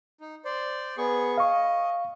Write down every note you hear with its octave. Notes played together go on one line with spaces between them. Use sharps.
D#4
C5 D5
B3 G#4 C#6
D#5 F5 C#6